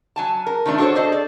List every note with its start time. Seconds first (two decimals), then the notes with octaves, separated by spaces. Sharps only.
0.16 F#3 G#5 A5
0.46 A#4
0.66 D#3 F3 A3 D4
0.78 D4 F#4 A4 A#4 C5 C#5
0.95 G#4 A4 C5 D5 D#5
1.12 D5